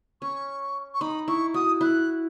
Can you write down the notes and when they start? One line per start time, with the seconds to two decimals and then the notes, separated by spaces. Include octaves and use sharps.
0.21 C#4 C#6
0.94 C#6
1.01 D#4 B5
1.28 E4 C#6
1.54 F#4 D#6
1.81 E4 F#6